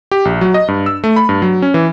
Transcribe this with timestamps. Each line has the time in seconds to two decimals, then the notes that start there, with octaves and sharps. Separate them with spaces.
0.11 G4
0.25 A#1
0.41 F#3
0.54 D#5
0.68 G2
0.86 E6
1.04 A3
1.16 B5
1.29 G2
1.42 F#3
1.62 C#4
1.74 E3